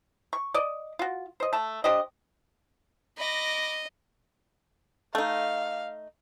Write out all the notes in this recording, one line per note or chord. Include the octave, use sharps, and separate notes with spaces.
C#6
D5 D#5
F4 F#4
C5 D#5
A3 A5
D4 G4 C5 D#5
D#5 B5 D6 A#6
A3 D#4 F5